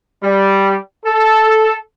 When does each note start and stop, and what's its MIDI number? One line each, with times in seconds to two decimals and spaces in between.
0.23 0.75 55
1.06 1.75 69